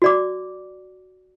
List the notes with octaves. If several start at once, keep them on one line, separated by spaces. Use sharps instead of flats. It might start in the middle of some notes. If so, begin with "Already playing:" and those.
F#4 D5 D6